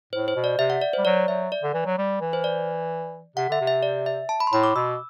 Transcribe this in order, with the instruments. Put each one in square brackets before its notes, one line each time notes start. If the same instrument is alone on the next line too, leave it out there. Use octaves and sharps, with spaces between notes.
[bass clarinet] A2 [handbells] C5
[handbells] C5
[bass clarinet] B2
[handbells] D5
[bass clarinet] C3 [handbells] E5
[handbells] F#5
D5
C5
[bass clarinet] G3
[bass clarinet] F#3 [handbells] D5
[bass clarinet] F#3 [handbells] E5
[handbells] D5
[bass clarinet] D3
E3
F#3
G3
E3
[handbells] C5
D5
[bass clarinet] C3 [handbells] F#5
[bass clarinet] D3 [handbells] E5
[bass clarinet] C3
[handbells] E5
D5
E5
A5
B5
C6
[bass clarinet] A2 [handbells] B5
[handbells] D6
[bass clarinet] B2 [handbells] E6